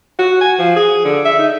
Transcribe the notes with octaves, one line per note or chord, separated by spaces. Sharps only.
F#4
G#5
F3
G#4
D3
E5
D#4